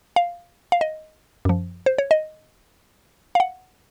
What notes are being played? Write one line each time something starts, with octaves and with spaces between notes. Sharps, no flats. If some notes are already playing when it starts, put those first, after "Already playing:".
F5
F5
D#5
F#2 F3
C5
C#5
D#5
F5
F#5